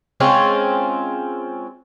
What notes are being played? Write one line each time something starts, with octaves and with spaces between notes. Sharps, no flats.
G#3 C4 C#4 F4